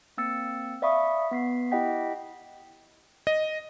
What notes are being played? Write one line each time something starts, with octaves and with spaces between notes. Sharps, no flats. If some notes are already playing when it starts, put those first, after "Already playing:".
A#3 C4 E6 A6 C#7
D5 E5 F5 B5 C#6 D#6
B3 B6 C7
E4 G4 D#5 F#5 G5 B6
D#5